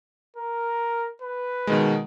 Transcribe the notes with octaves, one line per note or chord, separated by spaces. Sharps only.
A#4
B4
B2 D#3 G#3